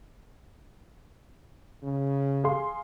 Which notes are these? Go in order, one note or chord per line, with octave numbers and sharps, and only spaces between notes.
C#3
G#4 F5 C6